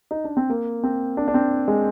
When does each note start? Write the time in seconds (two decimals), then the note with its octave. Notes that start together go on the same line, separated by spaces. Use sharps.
0.11 D#4
0.24 D4
0.37 C4
0.50 A#3
0.84 C4
1.17 D4
1.28 D4
1.34 C4
1.68 G#3